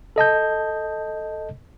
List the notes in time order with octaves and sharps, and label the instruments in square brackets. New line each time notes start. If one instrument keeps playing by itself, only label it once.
[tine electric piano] A4 D#5 A5 G6